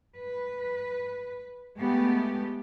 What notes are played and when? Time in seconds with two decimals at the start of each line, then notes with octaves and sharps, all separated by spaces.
0.18 B4
1.78 G#3 A3 B3 G4